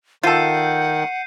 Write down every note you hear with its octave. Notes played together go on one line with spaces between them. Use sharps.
D#3 F4 A4 F#5 G6 C7 D#7